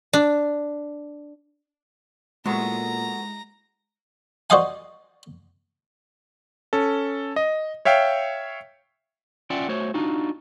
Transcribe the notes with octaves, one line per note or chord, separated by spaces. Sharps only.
D4
A#2 F#3 G#3 A3 B3 E4 A#5
F#4 C5 D5 D#5 F5 G#5
C#4 A4
D#5
C#5 E5 F5 G5
C#4 F4 D5 E5 F#5 G5
A3 F#4 C5 C#5
D4 D#4 F4 F#4